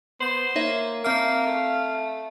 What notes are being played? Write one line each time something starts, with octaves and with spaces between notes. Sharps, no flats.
B3 C5 G6 F#7
A#3 D#4 C#5 E5
A#3 C4 E5 F5 F6
A3